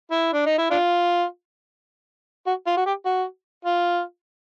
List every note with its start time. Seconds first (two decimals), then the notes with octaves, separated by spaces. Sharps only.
0.11 E4
0.34 D4
0.46 D#4
0.58 E4
0.70 D4 F4
2.47 F#4
2.67 F4
2.77 F#4
2.86 G4
3.06 F#4
3.65 F4